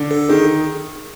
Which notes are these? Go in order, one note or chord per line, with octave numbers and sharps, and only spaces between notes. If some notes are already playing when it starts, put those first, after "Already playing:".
Already playing: D3
A4
D#3 G#4